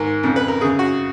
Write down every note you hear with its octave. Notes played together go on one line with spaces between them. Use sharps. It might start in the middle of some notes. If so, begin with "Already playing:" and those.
Already playing: G#2 D#3 A#4
F2 C#3
B4
A#4
F#2 C#3 G#4
F#4